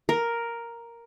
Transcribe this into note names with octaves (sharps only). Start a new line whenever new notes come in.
A#4